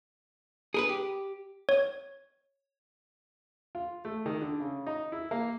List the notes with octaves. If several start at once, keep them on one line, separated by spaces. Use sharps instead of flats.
G#4 A#4 B4
G4
C#5
F4
A3
D#3
D3
C#3
D#4
E4
A#3